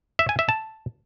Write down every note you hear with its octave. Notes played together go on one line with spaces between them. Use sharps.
E5
G#5
E5
A5